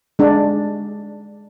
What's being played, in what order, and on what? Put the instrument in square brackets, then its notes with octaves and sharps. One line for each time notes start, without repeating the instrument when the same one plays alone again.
[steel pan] G#3 D4